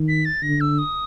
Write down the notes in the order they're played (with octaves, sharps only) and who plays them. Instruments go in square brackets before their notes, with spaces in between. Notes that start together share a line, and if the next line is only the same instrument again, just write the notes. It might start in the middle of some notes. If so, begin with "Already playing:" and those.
Already playing: [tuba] D#3
[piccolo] B6
A6
[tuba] D3 [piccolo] A#6
[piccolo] E6
D#6